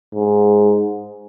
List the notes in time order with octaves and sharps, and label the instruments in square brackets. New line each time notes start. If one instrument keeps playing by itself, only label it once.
[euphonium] G#2